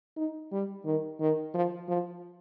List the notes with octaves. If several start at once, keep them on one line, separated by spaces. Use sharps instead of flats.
D#4
G3
D#3
D#3
F3
F3